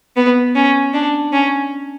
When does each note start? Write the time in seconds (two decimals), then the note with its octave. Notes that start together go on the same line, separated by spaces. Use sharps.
0.16 B3
0.55 C#4
0.93 D4
1.33 C#4